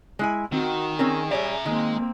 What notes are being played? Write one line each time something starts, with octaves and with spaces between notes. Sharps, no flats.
G#3 E4 G#5
D#3 C4 F#4
C4 C#4 G#4 A#4
G3 C#5 D5 E5 A#5
D#3 G#3 A#3 C4